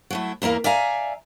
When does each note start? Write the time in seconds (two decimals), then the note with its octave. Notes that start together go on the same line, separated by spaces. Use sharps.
0.10 F#3 A3 E4
0.42 E2 A#3 E4 A#4 F5
0.64 D5 E5 F5 G#5 A#5